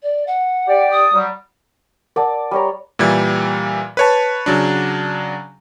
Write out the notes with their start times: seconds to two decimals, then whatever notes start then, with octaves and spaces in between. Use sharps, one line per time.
0.02 D5
0.27 F#5
0.67 G4 D5
0.91 D#6
1.13 F#3 G3
2.16 A#4 D5 F#5 A5
2.51 G3 C#5 A#5
2.99 A#2 E3 G3 G#6
3.97 B4 C#5 A5
4.46 C#3 F#3 D4